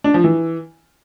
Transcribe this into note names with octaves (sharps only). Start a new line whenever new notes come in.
D4
F3
E3